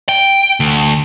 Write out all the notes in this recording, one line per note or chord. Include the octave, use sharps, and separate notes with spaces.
G5
D2